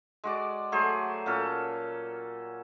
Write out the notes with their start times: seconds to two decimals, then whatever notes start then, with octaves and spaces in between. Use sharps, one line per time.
0.24 G#3 F#4 D5
0.72 F#3 A3 G#4 C5
1.26 A#2 C#4 A4